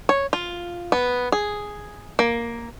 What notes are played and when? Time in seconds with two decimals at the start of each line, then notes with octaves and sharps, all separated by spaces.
0.09 C#5
0.33 F4
0.92 B3
1.32 G#4
2.19 A#3